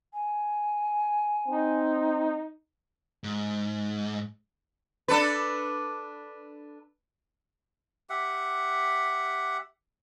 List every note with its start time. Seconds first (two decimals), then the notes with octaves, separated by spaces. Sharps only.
0.14 G#5
1.48 C4 D#4
3.24 G#2
5.08 D4 A4 B4
8.10 G4 E5 F#5